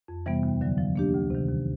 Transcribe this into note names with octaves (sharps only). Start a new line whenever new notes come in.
F2
C3 E3 G3 B3
D#2
D3 F#3
F3
A#3 D4 G4
D2
C3 D#3
D#2